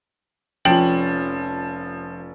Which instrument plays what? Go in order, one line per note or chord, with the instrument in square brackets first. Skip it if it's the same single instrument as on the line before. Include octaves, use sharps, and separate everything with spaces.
[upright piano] F1 C#4 [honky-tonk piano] F3 F#7 [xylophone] G5